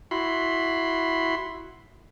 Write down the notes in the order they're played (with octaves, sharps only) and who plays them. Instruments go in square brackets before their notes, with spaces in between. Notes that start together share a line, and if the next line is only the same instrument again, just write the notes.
[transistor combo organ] E4 F#4 B5 C6